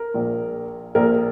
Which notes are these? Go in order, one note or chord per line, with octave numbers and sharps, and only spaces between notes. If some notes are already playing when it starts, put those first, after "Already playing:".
Already playing: A#4
A#1 A#2
A#1 A#2 A#4